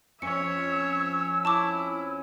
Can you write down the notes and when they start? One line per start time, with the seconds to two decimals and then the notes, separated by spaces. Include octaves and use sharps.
0.22 F2 C#4 C#5 E5 E6 C#7
1.45 E4 A5 C#6 D6